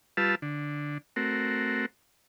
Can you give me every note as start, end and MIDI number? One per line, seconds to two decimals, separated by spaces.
0.17 0.35 55
0.17 0.35 65
0.17 0.35 71
0.17 0.35 81
0.17 0.35 88
0.42 0.98 50
1.16 1.86 57
1.16 1.86 60
1.16 1.86 66
1.16 1.86 70